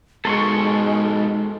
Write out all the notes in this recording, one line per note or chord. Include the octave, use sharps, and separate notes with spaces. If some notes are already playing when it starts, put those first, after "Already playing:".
G#2 B2 G#3 A4 C6 C#6